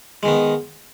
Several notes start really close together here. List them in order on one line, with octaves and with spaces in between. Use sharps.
G#3 D#3 B3